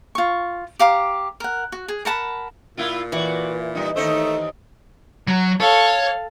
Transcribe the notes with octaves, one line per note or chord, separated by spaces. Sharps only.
F4 C#6
G4 F5 A#5 D6
A#4 F#5
F#4
G#4
A#4 F#5 A5 B5
A#2 A#3 E4 F4
E3 F#4 D5
G3 D#4
D#2 A3 D#4 C5
F#3
A4 C#5 F5